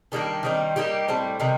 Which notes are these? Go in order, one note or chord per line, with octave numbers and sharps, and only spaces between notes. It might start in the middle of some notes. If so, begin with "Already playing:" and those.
D#3 G3 A#3 D4
D#3 G3 C4 D#4
G3 A#3 D#4 G4
A2 G3 C4
C3 D#3 G3